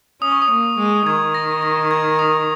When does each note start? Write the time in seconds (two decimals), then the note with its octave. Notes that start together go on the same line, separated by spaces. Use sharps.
0.22 C#4 D#6
0.32 C#6
0.42 D#6
0.51 A#3
0.78 G#3
1.06 D#3 G#6
1.34 A#6
1.62 A#6
1.91 G#6
2.19 D#6